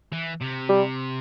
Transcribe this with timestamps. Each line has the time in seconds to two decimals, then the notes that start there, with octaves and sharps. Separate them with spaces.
0.12 E3
0.41 C3
0.69 G3